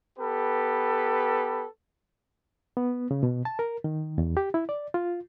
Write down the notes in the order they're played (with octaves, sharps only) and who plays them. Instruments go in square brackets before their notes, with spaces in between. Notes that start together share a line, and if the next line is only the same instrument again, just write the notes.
[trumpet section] B3 G4 A4 B4
[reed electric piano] B3
C#3
B2
A5
A#4
D#3
E2
G4
E4
D5
F4